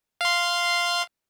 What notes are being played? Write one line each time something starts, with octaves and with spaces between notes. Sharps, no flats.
F5 C6